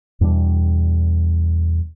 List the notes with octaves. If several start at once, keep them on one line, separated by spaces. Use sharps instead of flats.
E2 B2 G3 D4